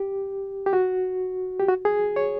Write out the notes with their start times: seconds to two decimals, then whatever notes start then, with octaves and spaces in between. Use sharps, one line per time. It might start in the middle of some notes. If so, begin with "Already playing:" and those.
Already playing: G4
0.66 G4
0.73 F#4
1.60 G4
1.68 F#4
1.85 G#4
2.16 C#5